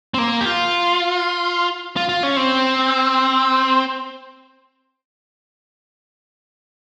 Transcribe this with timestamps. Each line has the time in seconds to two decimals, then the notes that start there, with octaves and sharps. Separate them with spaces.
0.14 C4
0.18 A#3
0.41 G4
0.46 F4
1.96 F4
2.09 F4
2.23 C#4
2.37 C4